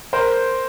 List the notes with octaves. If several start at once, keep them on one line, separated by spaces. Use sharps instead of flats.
A#4 C5